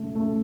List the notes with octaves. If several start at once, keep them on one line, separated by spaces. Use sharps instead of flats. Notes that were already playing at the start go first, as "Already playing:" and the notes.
Already playing: C#3 A3
A3